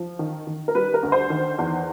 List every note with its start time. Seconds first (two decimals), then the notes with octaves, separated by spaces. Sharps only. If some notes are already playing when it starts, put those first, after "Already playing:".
Already playing: F3
0.19 D#3
0.47 D#3
0.68 A#4
0.75 G3 B4
0.94 A#4
1.03 D2
1.12 C5
1.30 D#3
1.58 E2